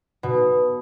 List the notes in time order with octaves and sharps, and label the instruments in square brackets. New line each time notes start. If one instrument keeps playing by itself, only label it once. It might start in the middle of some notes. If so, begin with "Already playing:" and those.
[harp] B2